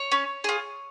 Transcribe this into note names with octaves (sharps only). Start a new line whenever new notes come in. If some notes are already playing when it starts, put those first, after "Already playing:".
Already playing: C#5
C#4
F4 G#4